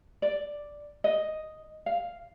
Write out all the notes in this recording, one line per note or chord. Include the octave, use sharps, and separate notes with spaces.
D5
D#5
F5